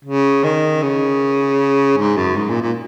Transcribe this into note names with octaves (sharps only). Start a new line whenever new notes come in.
C#3
D#3
C#3
G#2
F#2
G#2
A#2
A#2